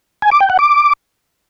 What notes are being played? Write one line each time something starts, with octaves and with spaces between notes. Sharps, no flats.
G#5
D6
G5
F#5
D6